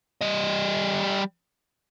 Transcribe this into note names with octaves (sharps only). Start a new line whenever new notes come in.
G3 D#5